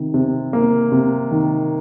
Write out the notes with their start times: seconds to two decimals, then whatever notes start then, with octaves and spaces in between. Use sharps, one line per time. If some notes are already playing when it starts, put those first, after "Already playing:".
Already playing: C3 D#3
0.14 C3
0.53 A#3
0.92 C3
1.31 D#3